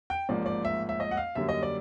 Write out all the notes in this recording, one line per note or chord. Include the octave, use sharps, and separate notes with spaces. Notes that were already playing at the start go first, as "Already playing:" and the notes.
G5
A1 G#2 F3 A#3 D5
D5
E5
E5
D#5
F#5
F5
F#2 D3 G3 A#3 E5
D#5
D5